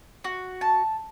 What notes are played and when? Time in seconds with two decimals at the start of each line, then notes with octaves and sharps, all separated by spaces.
0.24 F#4
0.61 A5